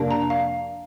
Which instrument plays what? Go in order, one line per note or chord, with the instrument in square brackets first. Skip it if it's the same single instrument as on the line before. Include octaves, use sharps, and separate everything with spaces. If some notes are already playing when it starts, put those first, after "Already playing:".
Already playing: [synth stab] F2 C3 A#3 D4
[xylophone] A#5
F5